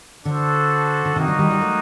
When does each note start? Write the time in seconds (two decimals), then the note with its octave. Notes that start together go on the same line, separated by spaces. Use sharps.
0.25 D3 D4 F#4 A4 C5
1.05 D3
1.16 C3 D#3 A#3 D#4 F#4
1.28 D3 F#3
1.39 D#3 G3
1.50 D#3 G3
1.61 F#3 A3